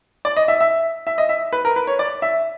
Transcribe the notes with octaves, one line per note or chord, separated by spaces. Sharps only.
D5
D#5
E5
E5
E5
D#5
E5
B4
A#4
B4
C#5
D5
E5